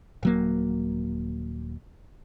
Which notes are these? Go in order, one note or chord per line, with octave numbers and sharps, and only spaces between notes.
D#1 F#3 A#3